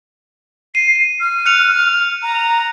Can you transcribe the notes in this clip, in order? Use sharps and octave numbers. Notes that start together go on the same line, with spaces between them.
C7 D#7
F6
F#6 C#7 F7
A#5